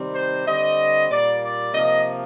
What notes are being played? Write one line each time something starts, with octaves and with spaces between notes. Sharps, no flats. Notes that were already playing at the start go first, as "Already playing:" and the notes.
Already playing: C3 D#3 G3 C4
C5
D3 G3 C4 D#5
A#2 G3 A#3 D5
D5
C3 F3 A#3 D#5